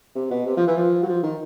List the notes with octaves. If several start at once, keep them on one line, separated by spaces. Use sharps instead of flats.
C3
B2
C3
F3
E3
F3
F#3
F3
D#3